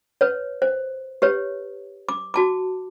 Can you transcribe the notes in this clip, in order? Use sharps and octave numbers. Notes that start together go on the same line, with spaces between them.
B4 C#5
C5
G4 B4 C#5
D6
F#4 A5 D6